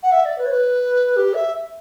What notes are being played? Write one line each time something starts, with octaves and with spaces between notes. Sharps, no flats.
F#5
E5
D5
B4
C#5
B4
G4
E5